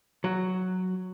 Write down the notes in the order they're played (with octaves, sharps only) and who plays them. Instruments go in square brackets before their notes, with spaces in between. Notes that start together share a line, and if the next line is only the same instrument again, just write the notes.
[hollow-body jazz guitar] F#3